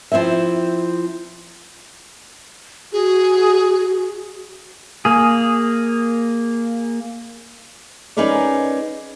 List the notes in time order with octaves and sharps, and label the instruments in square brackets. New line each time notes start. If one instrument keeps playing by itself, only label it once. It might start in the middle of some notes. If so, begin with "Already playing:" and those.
[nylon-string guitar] F3 C4 E4 E5
[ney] F#4 [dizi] G#4
[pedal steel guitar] A#3 G#4
[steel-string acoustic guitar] C#4 D#4 G#4 A#4 B4 D5